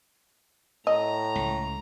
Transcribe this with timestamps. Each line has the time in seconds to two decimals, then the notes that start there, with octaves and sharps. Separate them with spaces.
0.87 A2 D#5 A#5
1.35 C#2